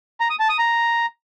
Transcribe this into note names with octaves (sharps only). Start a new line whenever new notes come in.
A#5
D#6
A5
D#6
A#5